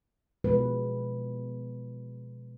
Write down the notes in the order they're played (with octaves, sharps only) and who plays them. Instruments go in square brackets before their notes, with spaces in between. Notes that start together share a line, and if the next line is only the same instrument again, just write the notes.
[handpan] B2 F3 G#3 B4